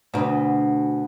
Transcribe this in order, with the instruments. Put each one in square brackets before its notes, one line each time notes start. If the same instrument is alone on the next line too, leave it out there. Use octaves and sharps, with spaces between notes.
[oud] D2 B2